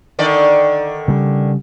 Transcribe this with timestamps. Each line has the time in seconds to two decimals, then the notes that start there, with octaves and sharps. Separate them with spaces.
0.19 D3 D#3 D5
1.08 C#3 G3